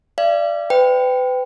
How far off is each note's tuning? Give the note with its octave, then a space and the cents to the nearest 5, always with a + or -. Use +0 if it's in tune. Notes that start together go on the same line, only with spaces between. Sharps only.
D5 +0 F5 -45
B4 +35 G5 +0